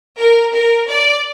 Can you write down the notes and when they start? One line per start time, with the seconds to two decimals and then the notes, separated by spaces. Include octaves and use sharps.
0.18 A#4
0.54 A#4
0.89 D5